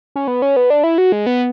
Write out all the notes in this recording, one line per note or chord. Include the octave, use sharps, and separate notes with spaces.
C#4
B3
C#4
B3
D4
E4
F#4
G#3
B3